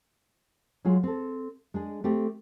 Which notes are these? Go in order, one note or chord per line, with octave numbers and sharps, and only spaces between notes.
F#3 G#3 F4 G#4
C4 A4
G#3 D4 G#4
A3 C4 G4